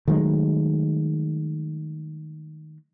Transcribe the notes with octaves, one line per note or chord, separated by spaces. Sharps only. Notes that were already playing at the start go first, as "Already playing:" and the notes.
D#3 F#3 G#3 A3